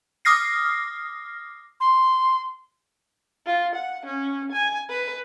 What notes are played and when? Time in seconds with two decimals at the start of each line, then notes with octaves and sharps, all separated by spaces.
0.25 D6 D#6 F6 A#6 C7
1.80 C6
3.46 F4
3.75 F#5
4.06 C#4
4.52 G#5
4.90 B4